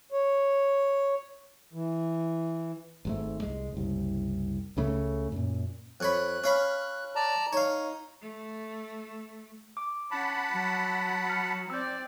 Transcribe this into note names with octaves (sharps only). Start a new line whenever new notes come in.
C#5
E3
G#1 G#2 A3
C2 G#3
F#1 C2
C#2 C#3 A3
F#2 A#2
F2 C#5 B5 F#6
C#4 F5 B5
D5 A5 A#5
D#4 C#5 F5
A3
D6
C#4 F#5 A5 B5
F#3
F6 A#6 C#7
C4 D5 E6 G6